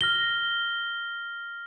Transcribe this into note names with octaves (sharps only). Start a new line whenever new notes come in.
F6 A#6 G7